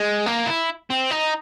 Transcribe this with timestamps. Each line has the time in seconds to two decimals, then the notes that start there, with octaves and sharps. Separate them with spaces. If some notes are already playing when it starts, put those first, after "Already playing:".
Already playing: G#3
0.26 A#3
0.46 E4
0.90 C4
1.11 D#4